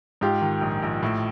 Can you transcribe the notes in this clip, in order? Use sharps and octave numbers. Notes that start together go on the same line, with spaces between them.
G#2 F4 G4
D#3
A#1
A#1
A2